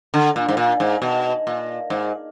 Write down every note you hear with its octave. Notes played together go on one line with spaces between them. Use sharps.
D3
A#2
G#2
A#2
G#2
B2
A#2
G#2